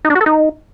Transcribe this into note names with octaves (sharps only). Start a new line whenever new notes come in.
D#4
D4
F#4
A4
D#4